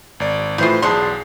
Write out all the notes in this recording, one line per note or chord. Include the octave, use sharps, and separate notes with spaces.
G#1 D5
A2 E3 D#4 F4 C5 C7
B1 E2 B2 D4 G#4 C6